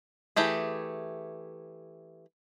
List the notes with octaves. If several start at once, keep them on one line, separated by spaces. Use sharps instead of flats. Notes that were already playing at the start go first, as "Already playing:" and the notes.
E3 A3 G4 G#4